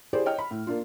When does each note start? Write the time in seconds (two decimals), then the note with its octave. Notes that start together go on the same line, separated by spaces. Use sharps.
0.13 E4 G4 G#4 C5 D5
0.26 C#5 D#5 G5 F6
0.39 B5
0.51 A2
0.67 A#3 D4 F4